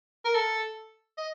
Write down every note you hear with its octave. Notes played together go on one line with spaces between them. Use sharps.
A#4
A4
D#5